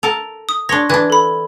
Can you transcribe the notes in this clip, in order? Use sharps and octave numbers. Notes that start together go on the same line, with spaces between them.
A4 A#4 A5 F7
D#6
D4 C#5 C6 A#6
E3 D4 F#6 G#6
A4 B5